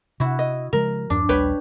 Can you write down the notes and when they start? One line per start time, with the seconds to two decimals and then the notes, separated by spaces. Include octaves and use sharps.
0.20 C3 E4 F#4
0.39 D#5
0.73 C#3 F3 G#3 A#4
1.10 E2 G2 F3 D4
1.29 A#1 D#2 G3 B4 C#5 G5 B5